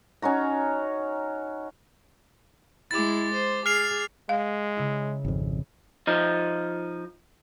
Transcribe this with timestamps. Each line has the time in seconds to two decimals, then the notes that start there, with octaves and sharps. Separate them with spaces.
0.22 C#4 D#4 F#4 A#5
2.91 G#3 E4 D6 A6
3.33 C5
3.66 G#4 F6 C7 F7
4.29 G#3 F5
4.77 C#3 E4
5.25 G#1 F2
6.07 F3 D#4